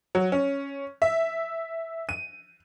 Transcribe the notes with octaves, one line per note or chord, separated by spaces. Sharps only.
F#3
C#4
E5
D#7